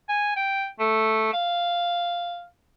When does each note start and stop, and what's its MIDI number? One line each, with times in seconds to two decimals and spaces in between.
0.09 0.34 80
0.36 0.66 79
0.80 1.33 57
1.33 2.45 77